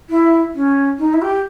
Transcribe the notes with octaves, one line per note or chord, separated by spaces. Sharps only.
E4
C#4
D#4
E4
G4